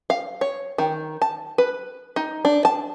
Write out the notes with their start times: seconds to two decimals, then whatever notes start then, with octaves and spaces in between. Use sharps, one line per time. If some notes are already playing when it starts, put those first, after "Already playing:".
0.10 F5
0.41 C#5
0.78 D#3
1.22 A5
1.58 B4
2.16 D#4
2.45 D4
2.65 A5